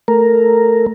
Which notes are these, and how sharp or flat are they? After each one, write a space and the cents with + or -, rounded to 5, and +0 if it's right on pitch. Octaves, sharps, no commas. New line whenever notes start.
A3 +0 A#4 +0